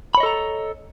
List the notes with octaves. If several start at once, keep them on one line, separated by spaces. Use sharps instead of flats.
A4 C#5 D#5 A#5 B5